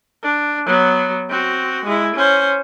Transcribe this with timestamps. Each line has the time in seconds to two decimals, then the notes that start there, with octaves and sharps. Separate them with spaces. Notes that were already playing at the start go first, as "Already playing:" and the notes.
0.23 D4
0.66 F#3 B3
1.30 C4 F#4
1.85 G#3 E4
2.15 C#4 C5